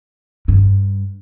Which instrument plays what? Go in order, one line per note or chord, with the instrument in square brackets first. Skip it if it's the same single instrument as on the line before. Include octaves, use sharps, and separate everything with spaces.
[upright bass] G2